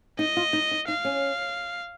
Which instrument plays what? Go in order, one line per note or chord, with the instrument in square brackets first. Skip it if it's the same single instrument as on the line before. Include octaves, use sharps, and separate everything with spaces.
[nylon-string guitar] D#4 [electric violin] D#5
[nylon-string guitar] F4
D#4
D#4
[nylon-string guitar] D#4 [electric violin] F5
[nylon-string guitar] C#4